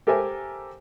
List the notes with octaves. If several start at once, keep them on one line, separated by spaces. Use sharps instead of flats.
G4 A4 A#4 C5 E5 G#5